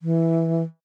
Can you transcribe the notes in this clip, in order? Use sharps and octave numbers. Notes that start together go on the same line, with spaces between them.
E3